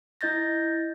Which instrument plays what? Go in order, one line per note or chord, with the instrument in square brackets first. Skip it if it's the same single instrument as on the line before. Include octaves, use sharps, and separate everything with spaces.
[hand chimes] E4 D#5 G6 A6 A#6